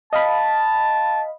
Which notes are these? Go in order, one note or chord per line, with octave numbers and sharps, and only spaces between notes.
D#5 F5 A5 B5